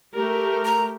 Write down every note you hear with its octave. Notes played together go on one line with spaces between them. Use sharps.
A3 G4 A#4
A#5